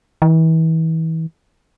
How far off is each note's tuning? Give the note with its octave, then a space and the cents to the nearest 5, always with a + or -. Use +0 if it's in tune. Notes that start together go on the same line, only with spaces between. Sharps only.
E3 -35